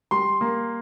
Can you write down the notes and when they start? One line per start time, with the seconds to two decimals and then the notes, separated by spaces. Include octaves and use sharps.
0.11 G3 C6
0.41 A#3